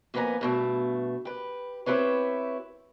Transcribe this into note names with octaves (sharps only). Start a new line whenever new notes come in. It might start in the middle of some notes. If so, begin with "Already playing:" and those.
F2 A#3 B3 B4 G#5 A#5
G2 B2 A3
G4 B4
C4 E4 G4 B4 C#5